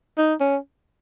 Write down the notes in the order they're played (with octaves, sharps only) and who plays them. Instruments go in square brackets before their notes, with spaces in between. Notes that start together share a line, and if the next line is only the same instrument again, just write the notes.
[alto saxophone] D#4
C#4